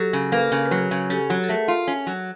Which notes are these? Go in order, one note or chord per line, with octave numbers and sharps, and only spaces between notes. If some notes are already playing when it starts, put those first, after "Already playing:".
Already playing: F#3 G4 A4
C#3
A#3 A4 B4
C#3
B4
F#3 G#4 A#4
C#3
C#4 G4 A4
F#3
A4
A3 G#4 A#4
F4
C#4
F#3